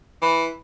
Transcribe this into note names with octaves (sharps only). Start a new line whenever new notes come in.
E3